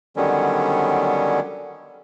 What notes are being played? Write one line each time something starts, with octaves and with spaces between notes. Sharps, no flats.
D3 D#3 F#3 G3 B3 C#4